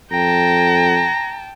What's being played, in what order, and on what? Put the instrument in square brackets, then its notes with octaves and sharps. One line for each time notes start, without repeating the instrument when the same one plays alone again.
[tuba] F2 [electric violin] G5 A5 [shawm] A#5